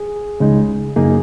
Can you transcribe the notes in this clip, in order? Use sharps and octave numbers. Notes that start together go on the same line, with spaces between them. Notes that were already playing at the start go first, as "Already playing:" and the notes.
Already playing: G#4
C#2 C#3 G#3 D#4
F#2 C#3 A#3 D#4 G#4